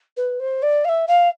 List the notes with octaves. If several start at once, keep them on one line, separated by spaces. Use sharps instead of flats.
B4
C5
D5
F5
E5
F5